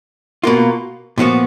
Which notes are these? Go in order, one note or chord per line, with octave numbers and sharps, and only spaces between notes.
B2 A#3 F4
A#2 F3 B3 F#4